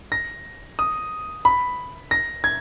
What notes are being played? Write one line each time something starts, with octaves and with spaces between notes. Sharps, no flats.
A#6
D#6
B5
A#6
G#6